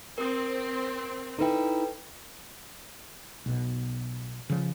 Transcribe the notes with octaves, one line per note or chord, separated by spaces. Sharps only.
C4 A#4 D#6
D#4 E4 A4 B4 G5
B1 B2
C#3 F3